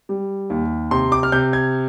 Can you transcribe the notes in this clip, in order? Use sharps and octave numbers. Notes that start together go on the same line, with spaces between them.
G3
D#2
C3 C6
D6
F6
C3 G6
G#6